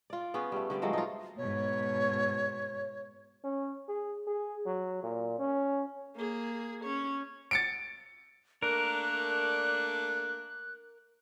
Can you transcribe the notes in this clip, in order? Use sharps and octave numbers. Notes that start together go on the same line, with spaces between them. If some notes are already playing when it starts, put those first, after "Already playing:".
F4 D5
B3 C#4 G#4
G3 A3
D3 G3 D5
F3 F#3 G#3 A3
D#4 F4
G#2 B2 C#5
C#4
G#4
G#4
F#3
A#2
C#4
A#3 G#4
C#4 C#5
A6 C#7 D7
A3 A#3 D4 A#4 F#6